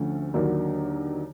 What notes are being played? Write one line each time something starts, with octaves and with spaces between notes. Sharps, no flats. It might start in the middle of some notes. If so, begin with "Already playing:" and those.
Already playing: D2 D3 F3 A3 C#4
D#2 D3 F#3 A#3 D4